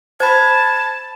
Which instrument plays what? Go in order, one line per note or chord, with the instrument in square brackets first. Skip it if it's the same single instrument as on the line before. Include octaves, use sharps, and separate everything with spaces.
[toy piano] C5 [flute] A5 [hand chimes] B5 G#6